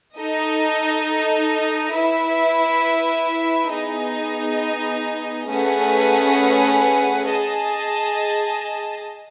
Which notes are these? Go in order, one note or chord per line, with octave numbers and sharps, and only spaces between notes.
D#4 A4 D#5
E4 B4 E5
B3 D#4 G#4 D#5
A3 C#4 G#4 B4 F#5
G#4 D#5 A5